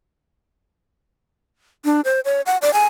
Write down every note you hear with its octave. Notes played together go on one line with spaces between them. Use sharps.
D4
C5
C#5
F#5
D5
G#5